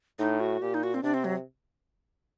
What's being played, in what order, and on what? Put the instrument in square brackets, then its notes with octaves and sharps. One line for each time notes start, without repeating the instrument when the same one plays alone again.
[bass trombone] A2 [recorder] D#4
[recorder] F#4
[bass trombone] A#2 [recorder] G4
[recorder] D#4
F#4
C4
[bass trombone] C3 [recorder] D4
[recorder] C4
F#3